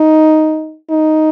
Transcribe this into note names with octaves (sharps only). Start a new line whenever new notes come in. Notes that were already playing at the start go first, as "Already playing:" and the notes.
Already playing: D#4
D#4